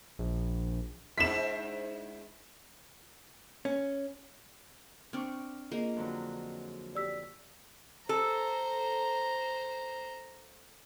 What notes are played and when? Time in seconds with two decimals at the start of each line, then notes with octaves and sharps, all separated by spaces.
0.19 A#1
1.18 G#2 D4 E4 B6 E7
3.65 C#4
5.13 C4 D4 C#6 D6 F6
5.72 A#3 F4 G#4 D#5
5.97 F2 D3 F#3
6.95 G4 D5 E6 B6
8.09 A4 C5 A#5